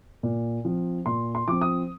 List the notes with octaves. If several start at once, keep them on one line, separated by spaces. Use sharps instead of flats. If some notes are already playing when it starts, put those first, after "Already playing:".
A#2
F3 C4
A#2 C6
C6
F3 C4 D6
D#6